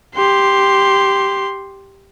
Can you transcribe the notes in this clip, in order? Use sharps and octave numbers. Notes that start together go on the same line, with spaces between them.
G4 C6